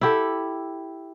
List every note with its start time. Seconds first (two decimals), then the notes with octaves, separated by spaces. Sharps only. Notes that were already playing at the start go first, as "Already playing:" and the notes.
0.01 E4 G4 A4